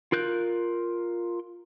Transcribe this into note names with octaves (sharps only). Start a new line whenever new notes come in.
F4 A#4 F#6 G6